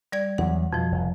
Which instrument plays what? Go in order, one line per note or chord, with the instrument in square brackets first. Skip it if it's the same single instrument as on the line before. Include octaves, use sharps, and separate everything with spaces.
[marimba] G3 D5 G#6
[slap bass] E2 F#3 [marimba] F#5
[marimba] F2 F3 [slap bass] B2
[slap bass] F1